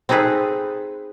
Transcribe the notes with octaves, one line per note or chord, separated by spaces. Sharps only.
C4 D#4 G#4 A4 B4